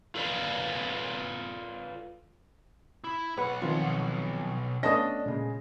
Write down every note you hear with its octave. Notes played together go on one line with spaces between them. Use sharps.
F4 A4 B4 D5 F5
E4
B1 B4 F#5
D#3 F3 C4 F4
A3 B3 C#4 D4 D#5 A5 D#6 A#6
A#2 C#3 G#3